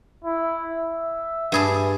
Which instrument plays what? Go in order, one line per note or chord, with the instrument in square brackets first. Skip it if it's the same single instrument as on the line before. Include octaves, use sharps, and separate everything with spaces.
[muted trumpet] E4
E5
[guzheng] G2 G#4 A5